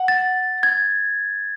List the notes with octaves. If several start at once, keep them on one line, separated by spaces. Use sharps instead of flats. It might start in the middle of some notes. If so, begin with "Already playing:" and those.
Already playing: F#5
A6
G#6